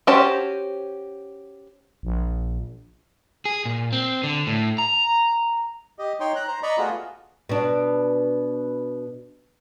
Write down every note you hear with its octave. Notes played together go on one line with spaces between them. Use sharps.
C#4 F#4 G4 C5 A5
A#1
G#4
A#2
C4
D3
A2
A#5
G4 D#5
D#4 C#5 G5 C6
A#5 F#6
C5 A#5
D5 D#5 A#5 B5 C#6
A3 B3 F4 F#4 G#4
B2 D4